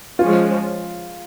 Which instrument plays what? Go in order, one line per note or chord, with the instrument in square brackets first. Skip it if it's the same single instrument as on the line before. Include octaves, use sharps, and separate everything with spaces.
[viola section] F3 G#3 C#4 [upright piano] F4